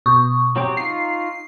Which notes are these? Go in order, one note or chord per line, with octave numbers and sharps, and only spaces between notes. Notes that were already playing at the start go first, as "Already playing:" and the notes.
B2 C#6 D#6
F#3 C4 G4
D#4 F4 C7